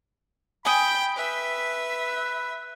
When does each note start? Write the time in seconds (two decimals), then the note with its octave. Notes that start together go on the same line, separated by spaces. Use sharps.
0.65 G5 G#5 B5 D#6
1.17 B4 E5